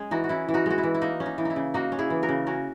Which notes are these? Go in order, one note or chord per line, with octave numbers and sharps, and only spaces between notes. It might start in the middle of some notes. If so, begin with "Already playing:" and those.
Already playing: G#3 C#4 G#4
E3 D#4 F#4
F#4
C#4 E4
E3
D#4 F#4
G#3 F#4
E4
E3
E4
A#3 D#4
C#4
D#4
E3
D#4 E4
C#3
A#3 D#4 F#4
C#4
E4 G#4
E3
F#4 A#4
C#3
C#4 F#4 A#4